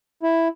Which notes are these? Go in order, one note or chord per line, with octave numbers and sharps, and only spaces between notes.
E4